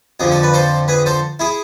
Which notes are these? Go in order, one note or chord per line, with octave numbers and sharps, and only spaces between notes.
F2 D3 F3 G#4
A4
B4
A4 C5
G#4 B4
A4 C5
E4 G#4